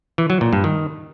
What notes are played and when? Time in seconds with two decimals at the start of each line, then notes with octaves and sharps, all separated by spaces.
0.18 E3
0.30 F#3
0.41 A#2
0.53 G2
0.64 D#3